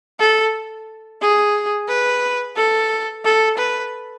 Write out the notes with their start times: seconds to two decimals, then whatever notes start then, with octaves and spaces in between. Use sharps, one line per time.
0.19 A4
1.21 G#4
1.88 B4
2.56 A4
3.24 A4
3.58 B4